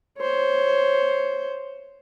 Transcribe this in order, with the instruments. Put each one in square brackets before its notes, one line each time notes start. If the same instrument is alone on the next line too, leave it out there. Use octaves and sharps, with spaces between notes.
[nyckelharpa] C5 C#5